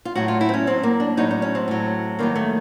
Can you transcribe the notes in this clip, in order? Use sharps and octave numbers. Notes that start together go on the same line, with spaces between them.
F4
A2 F#3 F#4
F4
E4
C4
C#4
A2 F#3 C4
A#3
D4
A2 F#3 D#4
D4
C#4
C4
A2 F#3
G2 D#3 F#3 A#3
A3